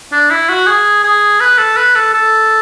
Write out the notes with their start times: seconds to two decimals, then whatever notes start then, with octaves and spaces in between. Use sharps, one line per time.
0.12 D4
0.31 E4
0.49 F#4
0.67 G#4
1.04 G#4
1.41 B4
1.58 A4
1.77 B4
1.96 A4
2.14 A4